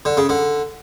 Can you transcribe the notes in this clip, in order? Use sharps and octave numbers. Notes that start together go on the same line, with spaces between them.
D3
C#3
D3